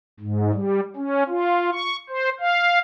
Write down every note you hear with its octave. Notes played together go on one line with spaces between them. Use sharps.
G#2
G3
C#4
F4
C#6
C5
F5